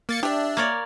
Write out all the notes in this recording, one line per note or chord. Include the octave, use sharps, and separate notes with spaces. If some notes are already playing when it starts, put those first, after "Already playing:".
A#3 A6 C#7
D4 G4 E5
A#3 C#5 D5